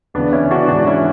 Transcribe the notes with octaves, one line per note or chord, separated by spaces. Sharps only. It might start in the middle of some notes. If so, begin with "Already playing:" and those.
D2 C#3 E3 B3 D4
C#4 E4
D4 F#4
G#2 E3 D4 F#4
C#4 E4